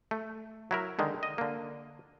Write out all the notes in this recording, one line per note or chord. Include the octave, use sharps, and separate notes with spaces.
A3
F#3 E4 A#4
D3 D#3 G#3
D#5
D3 A#3